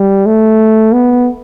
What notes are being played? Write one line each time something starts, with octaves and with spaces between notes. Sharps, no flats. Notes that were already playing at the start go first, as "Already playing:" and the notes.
Already playing: G3
A3
B3